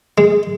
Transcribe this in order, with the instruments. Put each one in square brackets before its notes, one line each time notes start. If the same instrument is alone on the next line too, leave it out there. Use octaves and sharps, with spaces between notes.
[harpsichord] G#3